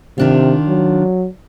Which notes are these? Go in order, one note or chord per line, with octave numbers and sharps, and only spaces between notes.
C3 D#3 D4 F4
F#3